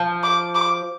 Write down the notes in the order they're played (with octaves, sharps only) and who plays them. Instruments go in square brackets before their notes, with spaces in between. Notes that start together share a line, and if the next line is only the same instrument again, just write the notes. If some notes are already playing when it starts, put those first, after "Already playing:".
Already playing: [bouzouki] F3
[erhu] D6
D6